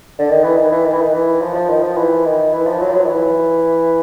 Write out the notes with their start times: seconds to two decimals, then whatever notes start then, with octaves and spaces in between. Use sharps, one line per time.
0.19 D3
0.29 D#3
0.44 E3
0.57 D#3
0.72 E3
0.85 D#3
0.93 E3
1.02 D#3
1.13 E3
1.41 F3
1.55 F3
1.69 D#3
1.83 F3
1.97 E3
2.26 D#3
2.53 E3
2.67 F3
2.81 F#3
2.90 F3
2.95 F#3
3.04 D#3
3.09 E3